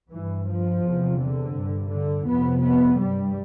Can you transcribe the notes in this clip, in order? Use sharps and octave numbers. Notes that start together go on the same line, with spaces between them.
G2 E3
F3
E2 C3
D3
G2
D3
F2 C3 B3
B3
G2 G3